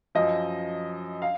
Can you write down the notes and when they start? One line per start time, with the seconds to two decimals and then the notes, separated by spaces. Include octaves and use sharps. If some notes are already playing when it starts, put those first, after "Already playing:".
0.15 F#2 F3 D#5
1.22 F5